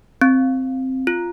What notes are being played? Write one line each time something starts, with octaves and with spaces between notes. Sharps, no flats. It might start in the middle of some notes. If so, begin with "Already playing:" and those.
C4
F4